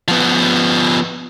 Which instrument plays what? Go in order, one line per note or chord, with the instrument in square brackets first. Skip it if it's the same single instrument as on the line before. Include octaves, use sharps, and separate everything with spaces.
[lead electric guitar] F3 B3